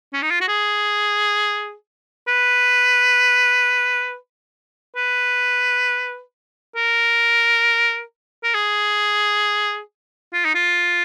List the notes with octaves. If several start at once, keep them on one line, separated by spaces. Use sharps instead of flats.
C#4
D#4
F4
F#4
G#4
B4
B4
A#4
A#4
G#4
F4
D#4
F4